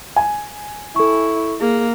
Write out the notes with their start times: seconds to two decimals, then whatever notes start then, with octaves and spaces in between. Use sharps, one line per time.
0.16 G#5
0.96 E4 A4 C#6
1.61 A#3 G#4